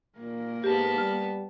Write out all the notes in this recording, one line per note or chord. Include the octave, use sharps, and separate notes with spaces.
A#2 A#3 A#4
G#2 B3 G4 A5
G3 F6